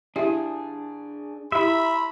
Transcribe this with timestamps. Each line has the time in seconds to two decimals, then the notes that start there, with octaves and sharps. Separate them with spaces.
0.16 D4 E4 G4 G#4 E5
1.52 E4 G4 E5 B5